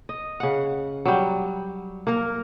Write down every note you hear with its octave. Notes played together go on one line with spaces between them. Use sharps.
D#5
C#3 F#5
F#3 G3
A#3 A#4